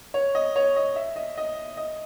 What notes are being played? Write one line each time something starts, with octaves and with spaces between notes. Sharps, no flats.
C#5
D#5
C#5
D#5
E5
D#5
D#5
D#5